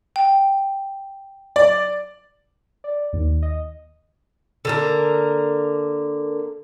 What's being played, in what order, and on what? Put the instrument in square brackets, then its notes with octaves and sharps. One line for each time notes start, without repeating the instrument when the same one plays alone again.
[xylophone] G5
[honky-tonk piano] D5
[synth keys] D5
D#2
D#5
[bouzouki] D3 A#3 A#4